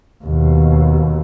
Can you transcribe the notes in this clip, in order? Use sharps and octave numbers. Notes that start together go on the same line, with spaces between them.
D#2 B2